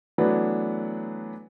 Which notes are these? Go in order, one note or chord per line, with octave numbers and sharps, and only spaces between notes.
E3 F#3 A3 B3 D4